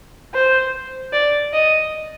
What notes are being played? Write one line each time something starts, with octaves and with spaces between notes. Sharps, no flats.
C5
D5
D#5